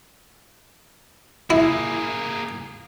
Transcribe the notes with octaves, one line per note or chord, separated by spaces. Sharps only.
A#3 E4 G#4